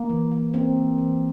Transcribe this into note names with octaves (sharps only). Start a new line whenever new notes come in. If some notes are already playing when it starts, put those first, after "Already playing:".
Already playing: A#3
E3
A#3
A#3 C4
E3
E3